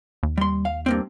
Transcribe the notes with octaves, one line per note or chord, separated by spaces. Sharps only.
D#2
G3 C6
F5
G2 A#3 C4